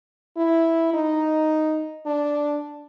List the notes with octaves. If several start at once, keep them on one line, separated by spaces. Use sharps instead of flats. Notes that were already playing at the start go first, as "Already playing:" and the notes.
E4
D#4
D4